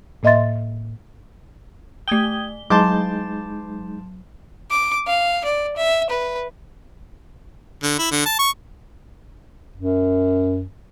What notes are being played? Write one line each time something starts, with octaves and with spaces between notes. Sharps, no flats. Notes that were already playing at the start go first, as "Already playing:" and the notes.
A2 A#3 D#5 E5 C6 A6
A3 G5 D#6 G#6 G7
F#3 G#3 D#4 A5 C6 D6 G6
D6
F5
D5
E5
B4
D3
E4
D3
A5
C#6
F#2